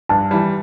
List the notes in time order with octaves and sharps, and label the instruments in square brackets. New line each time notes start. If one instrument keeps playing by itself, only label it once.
[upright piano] G2 [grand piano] A5
[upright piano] E3 G3